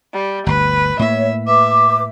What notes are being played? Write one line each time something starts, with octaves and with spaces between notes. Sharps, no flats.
G3
G1 D2 B4
A2 A#3 C#5 E5
B4 E5 D6